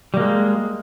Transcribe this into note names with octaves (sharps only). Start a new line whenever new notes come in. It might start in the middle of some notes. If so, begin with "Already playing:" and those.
G3 G#3 A#3